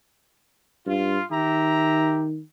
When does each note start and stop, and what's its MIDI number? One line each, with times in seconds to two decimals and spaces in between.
0.87 1.18 43
0.87 1.24 65
1.31 2.41 51
1.31 2.26 67
1.31 2.26 76
1.31 2.26 82